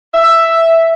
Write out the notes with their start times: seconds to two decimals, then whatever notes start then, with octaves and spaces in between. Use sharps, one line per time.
0.14 E5